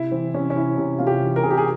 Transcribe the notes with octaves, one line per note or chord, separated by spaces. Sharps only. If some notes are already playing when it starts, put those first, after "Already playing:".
Already playing: C3 E4
E3 C4
C3 C#4
C#4
C3 E4
C3
C3 F4
G4
E3
A#4
C3 G#4
G4
G#4